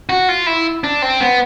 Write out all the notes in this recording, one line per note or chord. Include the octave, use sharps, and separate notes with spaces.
F#4
F4
E4
D4
C4
B3